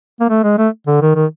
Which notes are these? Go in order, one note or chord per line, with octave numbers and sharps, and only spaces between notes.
A#3
A3
G#3
A3
D3
D#3
D#3